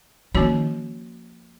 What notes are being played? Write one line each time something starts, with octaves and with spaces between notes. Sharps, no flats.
D#3 F3 A#3 C#4 F#4 C#5